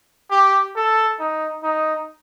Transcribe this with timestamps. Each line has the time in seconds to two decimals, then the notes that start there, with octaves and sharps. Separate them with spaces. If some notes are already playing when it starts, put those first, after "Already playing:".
0.31 G4
0.76 A4
1.20 D#4
1.63 D#4